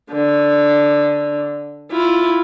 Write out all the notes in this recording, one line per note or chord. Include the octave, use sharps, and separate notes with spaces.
D3
E4 F4